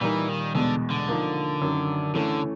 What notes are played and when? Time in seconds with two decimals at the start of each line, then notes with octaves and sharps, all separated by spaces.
0.01 A#2 E3 G3 A#3 D#4
0.29 D#3
0.55 E2 B2 D3 G#3
0.90 D3
1.08 F3 A#3 D#4
1.61 F#2 D#3 F#3
2.14 D3 E3 A3 C#4